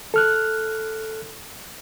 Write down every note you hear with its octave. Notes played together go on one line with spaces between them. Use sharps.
A4 F6 F#6